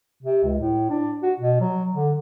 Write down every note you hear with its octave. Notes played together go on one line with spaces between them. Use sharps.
C3
C#2
A2
D4
F#4
B2
F#3
D3